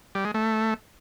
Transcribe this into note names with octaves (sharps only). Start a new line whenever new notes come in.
G3
G#3
A3